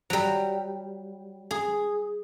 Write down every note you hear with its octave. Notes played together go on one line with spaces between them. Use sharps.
F#3 G3
G#4